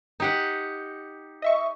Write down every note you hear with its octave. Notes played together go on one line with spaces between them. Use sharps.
D#4 G4 F#5
D#5 E5 C#6